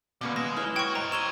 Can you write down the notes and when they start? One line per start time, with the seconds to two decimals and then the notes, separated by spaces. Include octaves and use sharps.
0.21 B2 D3 A#3 B3 C#4
0.36 G#3 A#6 E7
0.57 E4 B4 C#5 F6 G7
0.76 F#4 G5 C#6 F6
0.95 C5 D#5 A#5 D#7
1.12 G4 C#6 E6 G#6 E7 F7 G7